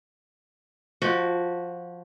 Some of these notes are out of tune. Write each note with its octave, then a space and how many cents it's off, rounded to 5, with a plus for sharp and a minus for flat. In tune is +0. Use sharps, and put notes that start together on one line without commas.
F3 +10 F#4 +0 F#5 +40